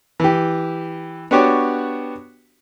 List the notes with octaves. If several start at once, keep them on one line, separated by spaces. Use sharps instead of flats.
E3 G4
B3 D4 F#4 G4 C#5 D5